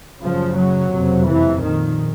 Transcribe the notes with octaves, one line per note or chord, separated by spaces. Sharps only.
F#1 F#2 C#3 F3
F#3
F#1 F2 C3
E3
A#1 A#2 D#3